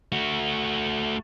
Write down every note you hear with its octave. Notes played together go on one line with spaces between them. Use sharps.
A3 F#4